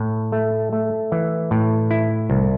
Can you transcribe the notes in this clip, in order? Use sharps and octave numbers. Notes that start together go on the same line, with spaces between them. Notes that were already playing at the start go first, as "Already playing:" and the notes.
Already playing: A2 E4
A3
A3
E3
A2
E4
C2